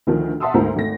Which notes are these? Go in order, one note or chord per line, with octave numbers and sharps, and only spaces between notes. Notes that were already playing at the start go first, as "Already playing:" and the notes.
D2 D#3 F3
E5 F#5 A5 C6 D#6 E6
D2 G#2 A#3 E4 C5 A#5
G#1 A3 A#6